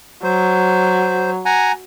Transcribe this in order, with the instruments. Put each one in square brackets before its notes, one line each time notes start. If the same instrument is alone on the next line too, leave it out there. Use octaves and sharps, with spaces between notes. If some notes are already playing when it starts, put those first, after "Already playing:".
[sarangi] F#3 [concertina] C5
[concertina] F#5 G#5 A#5